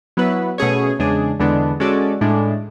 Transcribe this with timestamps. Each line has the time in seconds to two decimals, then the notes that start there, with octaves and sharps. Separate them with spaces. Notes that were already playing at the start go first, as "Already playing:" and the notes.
0.17 F#3 B3 E4 B4
0.58 B2 A3 C#4 G#4 C#5
0.99 E2 C#3 G#3 D4 G#4
1.40 E2 D3 G#3 B3 D4
1.80 G#3 C#4 F#4 A4 D5
2.21 A2 G#3 D4